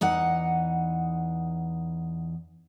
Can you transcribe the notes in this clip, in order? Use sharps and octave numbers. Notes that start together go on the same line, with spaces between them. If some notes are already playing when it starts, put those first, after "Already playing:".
E2 D#4 F#5